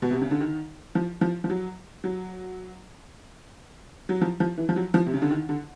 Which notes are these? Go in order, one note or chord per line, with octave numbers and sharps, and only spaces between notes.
B2
C3
C#3
D3
D#3
F3
F3
F3
F#3
F#3
F#3
F3
F3
E3
F3
F#3
F3
C3
C#3
D3
D#3
D3